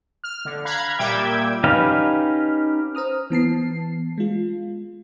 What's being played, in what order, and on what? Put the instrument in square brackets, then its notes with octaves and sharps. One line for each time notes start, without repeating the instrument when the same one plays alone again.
[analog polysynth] F6
D3
F5 A#5 B5 F#6 G#6
A#2 G3 E5 G5 D6 G#6
[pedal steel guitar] C#4 D#4 G4 B4 F5
[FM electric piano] C5 A#5 D#6 F6
E3 B3 A5 C7
G#3 F4